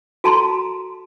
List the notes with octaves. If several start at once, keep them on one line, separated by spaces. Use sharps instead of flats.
F#4 A4 A5 A#5 C6